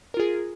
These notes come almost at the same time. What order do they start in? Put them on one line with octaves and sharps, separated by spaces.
A#4 F4 G#4